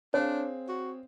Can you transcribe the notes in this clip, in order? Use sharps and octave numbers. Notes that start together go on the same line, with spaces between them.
C4 D4 G#4 C#5 F5
F#4